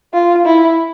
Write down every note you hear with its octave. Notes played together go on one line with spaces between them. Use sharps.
F4
E4